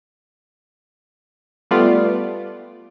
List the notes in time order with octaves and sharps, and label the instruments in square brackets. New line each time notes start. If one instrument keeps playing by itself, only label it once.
[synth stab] G3 A3 B3 F4 D5